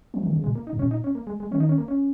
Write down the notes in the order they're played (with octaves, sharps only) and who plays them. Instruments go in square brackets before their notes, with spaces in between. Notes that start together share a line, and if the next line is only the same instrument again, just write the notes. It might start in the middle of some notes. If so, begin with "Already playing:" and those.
[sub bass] F3
D#3
C#3
[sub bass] A#2 [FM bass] G#3
[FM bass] A#3
D#4
[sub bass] G#2
[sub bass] A#2 [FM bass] C#4
[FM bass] D#4
C#4
A#3
G#3
G#3
[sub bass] D#3 [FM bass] C#4
[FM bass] D#4
C#4
A#3
C#4